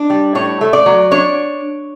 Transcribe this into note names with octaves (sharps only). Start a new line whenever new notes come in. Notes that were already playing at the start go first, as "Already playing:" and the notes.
Already playing: D4
G3
A2 C#5
A3
D5
F#3
D4 C#5